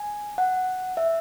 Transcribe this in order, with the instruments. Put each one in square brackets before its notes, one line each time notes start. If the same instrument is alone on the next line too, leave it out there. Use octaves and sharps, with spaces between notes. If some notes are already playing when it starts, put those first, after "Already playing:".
Already playing: [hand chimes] G#5
F#5
E5